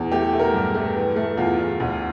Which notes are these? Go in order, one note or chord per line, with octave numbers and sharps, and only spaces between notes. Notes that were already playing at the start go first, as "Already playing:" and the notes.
Already playing: E2
A3 G4
A3
A#4
G2
A3
E3
A3
E2 F4
E2
D2